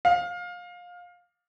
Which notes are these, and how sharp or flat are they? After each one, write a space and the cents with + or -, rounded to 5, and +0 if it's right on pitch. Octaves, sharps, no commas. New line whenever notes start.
F5 +25